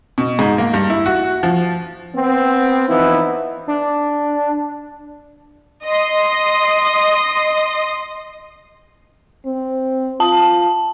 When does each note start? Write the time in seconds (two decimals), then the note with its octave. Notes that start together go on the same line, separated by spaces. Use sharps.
0.18 B2
0.39 G#2
0.58 A#3
0.74 G2
0.90 E4
1.06 F#4
1.43 F3
2.16 B3 C4
2.89 E3 F3 B3 D#4 E4
3.68 D4
5.84 D#5 C6
9.46 C4
10.20 F4 A5